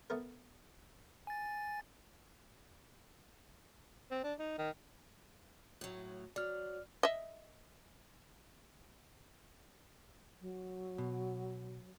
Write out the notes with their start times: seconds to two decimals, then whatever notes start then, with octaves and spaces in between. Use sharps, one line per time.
0.10 A3 B3 A#4
1.27 G#5 A6
4.11 C4
4.24 D4
4.39 D#4
4.58 D#3
5.81 A2 F#3
6.36 F#3 D5 F6
7.03 D#5 E5
10.41 F#3
10.98 B2